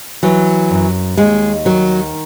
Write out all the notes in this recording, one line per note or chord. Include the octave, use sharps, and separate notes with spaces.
E3 F#3
F#2
D#2 G#3
D#3 F#3